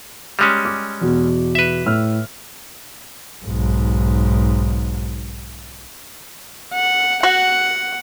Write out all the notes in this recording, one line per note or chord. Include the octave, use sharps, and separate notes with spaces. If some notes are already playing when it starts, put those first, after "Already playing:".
G3 G#3 C#4
D6
E2 B2
B4 E5
A2 E6 F6
B1 G#2
F#5
F#4 F#5